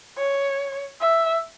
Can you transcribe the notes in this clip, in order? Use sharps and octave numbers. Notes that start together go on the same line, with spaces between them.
C#5
E5